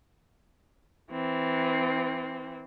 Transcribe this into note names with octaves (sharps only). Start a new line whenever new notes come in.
E3 C4